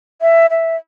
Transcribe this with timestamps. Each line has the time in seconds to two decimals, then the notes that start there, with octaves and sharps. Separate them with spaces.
0.21 E5
0.50 E5